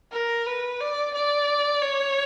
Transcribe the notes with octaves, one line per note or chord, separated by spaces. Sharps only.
A#4
B4
D5
D5
C#5